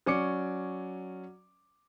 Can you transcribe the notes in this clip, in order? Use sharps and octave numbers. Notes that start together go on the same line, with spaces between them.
F#3 C#4 D5 D6 C#7